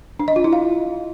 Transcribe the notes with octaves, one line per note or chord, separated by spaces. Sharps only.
D4
D#5
F4
E4
F5